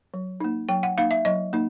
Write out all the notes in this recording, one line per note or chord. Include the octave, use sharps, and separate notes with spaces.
F#3
A#3 D#4
F#3 G5
F#5
A#3 D#4 F5
E5
F#3 D#5
A#3 D#4